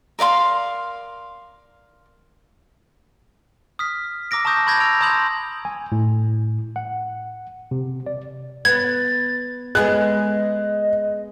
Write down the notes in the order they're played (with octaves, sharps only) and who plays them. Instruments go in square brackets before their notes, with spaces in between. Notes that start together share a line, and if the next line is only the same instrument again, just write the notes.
[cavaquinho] A#4 D5 F5 C6
[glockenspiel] D#6 F6 B6
A#5 D6 E6 A#6 D7
A5 A#5 C#6 D#6 G6 A#6
B5 C#6 G6 G#6 A#6
E6 D7 F7
A5 A#5 C6 D#6 G6 F#7
[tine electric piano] G#5
A2
F#5
C3
D5
[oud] B3 [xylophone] G#6 [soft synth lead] A6
[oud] G#3 B3 G#4 [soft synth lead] D#5 [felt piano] F#6